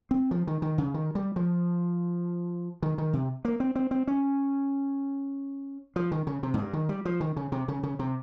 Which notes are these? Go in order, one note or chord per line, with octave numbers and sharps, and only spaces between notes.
C4
F3
D#3
D#3
C#3
D#3
G3
F3
D#3
D#3
C3
A#3
C4
C4
C4
C#4
F3
D#3
C#3
C3
G#2
G2
D#3
G3
F3
D#3
C#3
C3
C#3
C#3
C3